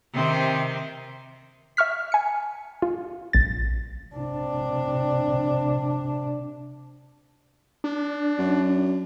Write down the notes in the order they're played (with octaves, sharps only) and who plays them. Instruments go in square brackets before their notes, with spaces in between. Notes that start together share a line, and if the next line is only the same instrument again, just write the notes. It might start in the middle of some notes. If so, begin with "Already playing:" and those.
[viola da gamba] C3 D#3 C5
[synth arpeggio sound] E5 C#6 F6 B6
G#5 C#7
F4
A#1 A6
[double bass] C3 D4
[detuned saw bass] D4
[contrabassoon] F#2